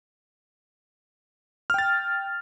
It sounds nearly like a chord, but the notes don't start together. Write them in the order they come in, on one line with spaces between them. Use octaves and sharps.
F6 G5 A6